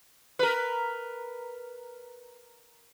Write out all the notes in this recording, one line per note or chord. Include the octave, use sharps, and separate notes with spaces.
A#4 B4